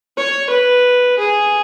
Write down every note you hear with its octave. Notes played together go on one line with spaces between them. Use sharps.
C#5
B4
G#4